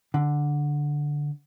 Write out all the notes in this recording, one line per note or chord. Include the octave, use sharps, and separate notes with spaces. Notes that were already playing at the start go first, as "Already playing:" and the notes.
D3